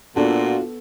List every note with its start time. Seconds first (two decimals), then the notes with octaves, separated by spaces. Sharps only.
0.16 A#2 B3 D4 F4 F#4 A4 F#5